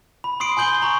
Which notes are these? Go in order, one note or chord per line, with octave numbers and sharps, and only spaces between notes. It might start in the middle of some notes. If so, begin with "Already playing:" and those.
B5
C6 D#6 C7 D7
G#5 C6 G6 F#7 G7
A#5 C6 C#6